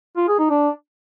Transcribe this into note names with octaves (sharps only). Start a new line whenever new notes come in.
F4
G#4
D#4
D4